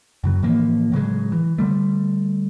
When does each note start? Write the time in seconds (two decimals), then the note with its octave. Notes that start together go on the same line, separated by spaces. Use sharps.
0.24 F#2 C#3 F#3
0.43 A2 E3 F3 A#3
0.92 A2 C#3 F#3 G#3
1.32 E3
1.58 D3 G3 A3